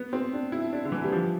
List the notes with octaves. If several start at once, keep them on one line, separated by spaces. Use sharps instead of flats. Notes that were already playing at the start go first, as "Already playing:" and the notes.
Already playing: B3
C4
D4
E4
D4
D3
E3
G3
F3